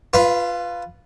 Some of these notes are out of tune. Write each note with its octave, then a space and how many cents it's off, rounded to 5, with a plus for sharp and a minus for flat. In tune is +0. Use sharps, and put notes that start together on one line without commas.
F4 +0 B4 +0 F5 -45